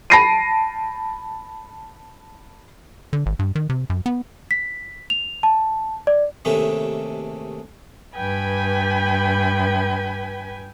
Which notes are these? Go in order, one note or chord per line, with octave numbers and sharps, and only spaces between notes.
A5 B5 A#6 C7 D7 D#7
D3
G#1
G2
D#3
C3
F#2
B3
B6
F7
A5
D5
D#2 C3 D#3 G#3 A3 C#4
G2 B4 G5 G#5 B5